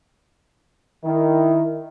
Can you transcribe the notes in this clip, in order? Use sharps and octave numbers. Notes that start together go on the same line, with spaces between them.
D#3 E4